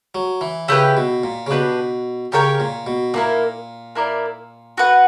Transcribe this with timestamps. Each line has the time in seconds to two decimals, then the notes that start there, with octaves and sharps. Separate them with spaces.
0.15 F#3
0.41 E3
0.68 C#3 E4 G4 B4
0.97 B2
1.24 A#2
1.47 C#3
1.50 B2 D4 G4 B4
2.32 C#3 G4 A#4 C#5 G5
2.60 A#2
2.87 B2
3.14 A#2 A#3 E4 A#4
3.95 A#3 E4 A#4 D5
4.77 F#4 B4 F#5